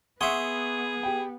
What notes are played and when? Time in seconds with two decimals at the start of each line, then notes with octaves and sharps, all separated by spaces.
0.21 B3 G#4 E5 F#5 C6 C#6 D#6
1.03 G4 G5